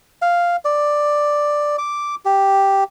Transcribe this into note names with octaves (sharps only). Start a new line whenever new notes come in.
F5
D5
D6
G4